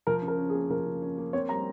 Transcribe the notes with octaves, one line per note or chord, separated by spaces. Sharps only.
F3 A#4
C#3
A#4
C#4
G#4
A#3
F3 A#4
C#3
C#4
A#3
C4 C#5
G3 A#5